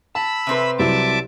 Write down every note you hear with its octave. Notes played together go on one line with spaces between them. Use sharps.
A5 B5 E6
C3 C4 B4
C2 F#3 E4 E5 A5 D6